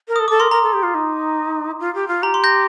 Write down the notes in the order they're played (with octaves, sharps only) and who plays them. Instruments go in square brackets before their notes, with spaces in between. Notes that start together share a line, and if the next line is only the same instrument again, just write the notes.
[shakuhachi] A#4
[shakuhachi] A4 [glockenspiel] D#6
[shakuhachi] A4 [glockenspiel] D6
[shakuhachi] A#4 [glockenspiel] C6
[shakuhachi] A#4 [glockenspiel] A#5
[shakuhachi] A4
G4
F4
D#4
F4
G4
F4
[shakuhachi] G4 [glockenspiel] A#5
[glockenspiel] C6
G6 A#6